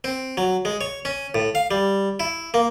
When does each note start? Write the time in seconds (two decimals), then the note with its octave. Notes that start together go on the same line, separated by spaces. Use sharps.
0.04 C4
0.37 F#3
0.65 G#3
0.81 C#5
1.05 C#4
1.35 A2
1.55 F5
1.71 G3
2.20 E4
2.54 A#3